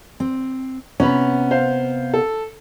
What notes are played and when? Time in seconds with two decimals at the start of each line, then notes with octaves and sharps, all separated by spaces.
0.20 C4
1.00 C3 B3 C#4 A#5 B5
1.51 C5 F5
2.14 A4